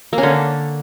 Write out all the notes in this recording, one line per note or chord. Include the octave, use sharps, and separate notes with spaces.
A#3
C#4
D3